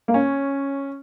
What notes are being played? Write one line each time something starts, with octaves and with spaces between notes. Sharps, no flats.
A#3
C#4